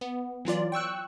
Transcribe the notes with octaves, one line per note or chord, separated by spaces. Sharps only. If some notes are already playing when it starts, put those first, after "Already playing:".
B3
E3 F#3 F4 D5
G5 C#6 E6 F#6